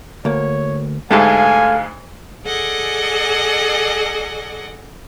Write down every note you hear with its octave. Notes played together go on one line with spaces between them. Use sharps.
D2 A#3 C#5
D2 G#2 G#3 A3 G4 A4 F5 G#5
G#4 A4 D5 D#5 F#5 G#5